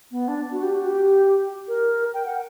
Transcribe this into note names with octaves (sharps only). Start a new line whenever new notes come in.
B3
D4
F#4
G4
F#4
G4
A#4
G5
F#5